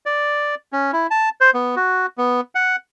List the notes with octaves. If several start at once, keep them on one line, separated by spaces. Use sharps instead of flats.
D5
C#4
E4
A5
C5
B3
F#4
B3
F#5